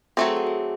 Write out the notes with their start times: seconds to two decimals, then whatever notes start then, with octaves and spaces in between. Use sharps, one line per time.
0.17 F#3 A3 C4 A4
0.27 G#4
0.37 F#4
0.47 G#4